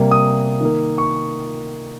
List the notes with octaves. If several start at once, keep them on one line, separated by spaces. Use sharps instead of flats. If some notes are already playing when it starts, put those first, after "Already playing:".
Already playing: C3 G3 A#3
D#6
D#3 A#3
C#6